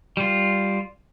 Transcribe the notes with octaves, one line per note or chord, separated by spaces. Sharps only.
G3 F4